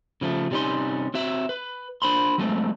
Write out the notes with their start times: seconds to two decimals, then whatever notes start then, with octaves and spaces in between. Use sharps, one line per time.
0.21 C#3 F3 G#3 A3
0.51 C3 G3 C#4 D#4 C6
1.14 C4 F#4 E5
1.49 B4
2.02 D4 C5 B5 C6
2.38 F#3 G#3 A3 C4